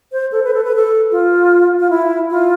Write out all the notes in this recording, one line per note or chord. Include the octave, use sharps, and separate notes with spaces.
C5
A4
B4
A4
B4
A4
F4
F4
E4
F4